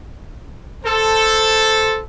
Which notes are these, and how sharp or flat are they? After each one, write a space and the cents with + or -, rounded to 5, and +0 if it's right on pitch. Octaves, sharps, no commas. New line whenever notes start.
A4 +0 C5 +0